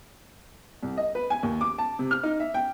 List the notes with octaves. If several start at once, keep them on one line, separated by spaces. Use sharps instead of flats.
C2
D#5
B4
G#5
D#2
D6
A5
C3
F6
D#4
E5
G5